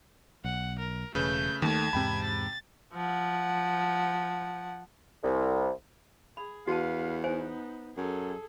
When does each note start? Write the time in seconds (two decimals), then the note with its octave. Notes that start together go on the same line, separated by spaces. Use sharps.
0.44 B1 F#5
0.79 A#4
1.15 E1 C#3 A3 B4 G6
1.62 D#2 D#3 G#3 A3 A5 G#6
1.93 E2 G#2 C3 C4 G5 B5
2.24 A6
2.94 F3 F#5
5.23 C2
6.37 G#4 B5
6.67 E2 F#4 B4 F5 A5
7.24 B3 D#4 C5 G#5
7.97 F#2 G#4 A4